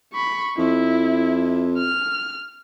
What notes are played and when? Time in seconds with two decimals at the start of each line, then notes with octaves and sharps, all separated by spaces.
0.13 B5 C#6
0.58 F2 E4
1.78 F6